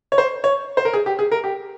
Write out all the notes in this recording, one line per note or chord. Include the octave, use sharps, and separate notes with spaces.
C#5
C5
C#5
C5
A#4
G#4
G4
G#4
A#4
G4